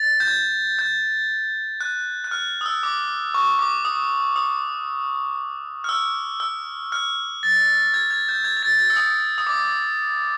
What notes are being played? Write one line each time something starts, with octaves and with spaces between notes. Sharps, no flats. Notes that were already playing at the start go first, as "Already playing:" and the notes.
Already playing: A6
G6
G#6
G6
F#6
F#6
F6
D#6
E6
D6
C#6
D6
D#6
D#6
F6
E6
E6
F6
A6
G#6
G#6
G6
G#6
G#6
A6
A6
G#6
E6
D#6
D#6
D6